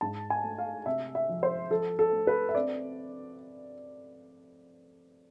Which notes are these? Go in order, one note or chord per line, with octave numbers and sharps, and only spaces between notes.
G#2 A5
G#5
A3
F5
C3 E5
E5
F3
C5
F3 A4
A4
A3
B4
E5
C4 D5